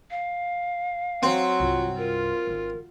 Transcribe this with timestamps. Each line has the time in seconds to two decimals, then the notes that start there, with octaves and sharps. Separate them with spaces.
0.11 F5
1.23 F#3 C4
1.60 C2 G2 F4
1.98 F4 A#4
2.47 G#1 D#3